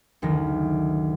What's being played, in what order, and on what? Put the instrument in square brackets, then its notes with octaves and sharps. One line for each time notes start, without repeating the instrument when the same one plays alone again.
[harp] F#1 D2 D#3 A#6